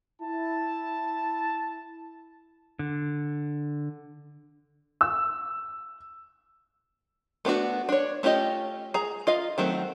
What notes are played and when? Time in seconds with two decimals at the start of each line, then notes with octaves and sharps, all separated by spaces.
0.21 E4 A5
2.79 D3
5.01 E6
7.45 A3 B3 D4 F#4
7.89 D4 C#5
8.23 A3 C#4 F4 G4 D#5
8.94 G#4 A#5
9.27 F4 D#5 F5
9.58 D#3 F#3 A3 C4